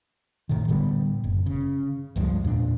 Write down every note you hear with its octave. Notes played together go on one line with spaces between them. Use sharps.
A1 A2 D#3
A2 D3 G3 B3
F#1
C#3
C#2 G2 F3 G#3
E2 A#2 D4